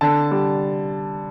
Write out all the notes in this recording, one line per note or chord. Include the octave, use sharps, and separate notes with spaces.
D3 A5
G3